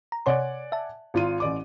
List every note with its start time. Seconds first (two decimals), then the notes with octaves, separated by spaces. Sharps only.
0.12 A#5
0.26 C3 C#5 D5 F#5 G#5 C6
0.72 E5 A5
1.14 G#1 F4 D#7
1.40 A1 D5 D6